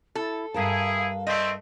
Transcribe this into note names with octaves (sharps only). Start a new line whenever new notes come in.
E4 A4
G2 E4 G#4 A#4 F5 A5
A3 C4 D#5